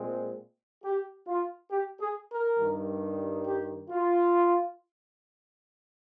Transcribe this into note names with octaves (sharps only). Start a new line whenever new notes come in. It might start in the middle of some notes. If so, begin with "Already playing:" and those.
Already playing: A#2 G#3 C4
G4
F4
G4
G#4
A#4
G2 D#3 G3
G4
F4